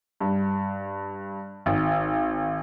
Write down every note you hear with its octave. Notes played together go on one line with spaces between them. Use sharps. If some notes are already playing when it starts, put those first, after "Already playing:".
G2
G#1